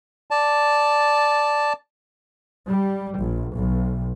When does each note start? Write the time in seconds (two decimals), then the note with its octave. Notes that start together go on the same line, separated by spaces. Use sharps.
0.31 D5 A5
2.70 G3
3.19 A#1
3.56 B1